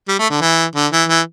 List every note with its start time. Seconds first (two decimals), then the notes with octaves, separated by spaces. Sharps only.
0.08 G3
0.19 A3
0.30 D3
0.41 E3
0.75 D3
0.92 E3
1.09 E3